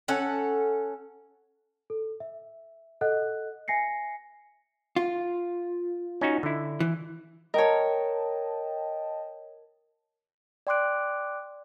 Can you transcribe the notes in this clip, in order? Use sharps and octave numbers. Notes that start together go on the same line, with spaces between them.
C#4 A4 F#5
A4
E5
A4 D#5 F#5 F#6
E5 G#5 A#6 C7 C#7
F4
C#4 D#4 F#4
D3 E4
E3
A#4 C#5 D#5 G5 A5
D5 G5 C6 D6 F#6 D7